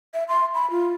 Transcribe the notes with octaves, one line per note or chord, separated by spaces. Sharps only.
E5
C6
B5
F4